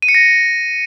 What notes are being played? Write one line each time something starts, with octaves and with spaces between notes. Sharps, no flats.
D#7
C#7
A#6